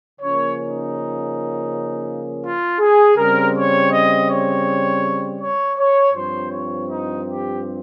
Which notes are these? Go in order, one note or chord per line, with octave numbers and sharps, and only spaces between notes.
C#3 F3 A#3 C#4 C#5
D#4
F4
G#4
C#3 G3 C4 A#4
C#5
D#5
C#5
C#5
C#5
G2 F3 C4 C5
C#5
D#4
G4